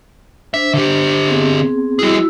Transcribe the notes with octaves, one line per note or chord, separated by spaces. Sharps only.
D4 C5 E5
D3 G4
B3 C4 G#4
G3 E4 F#4 G#4 E6